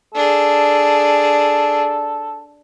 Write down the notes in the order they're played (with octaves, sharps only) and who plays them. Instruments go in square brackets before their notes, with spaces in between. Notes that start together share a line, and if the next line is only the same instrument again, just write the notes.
[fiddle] D4 G#4 [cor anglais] A4